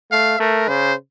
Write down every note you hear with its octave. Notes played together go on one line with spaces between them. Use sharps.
A3 F5
A3 A#4
C#3 C5